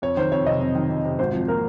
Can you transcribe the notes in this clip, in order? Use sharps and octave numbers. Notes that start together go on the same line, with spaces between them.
F2 C#5
D#3 C5
F2 C#5
C3 D#5
F2
D#3
F2
C3
G#1 C5
F3
A#3 A#4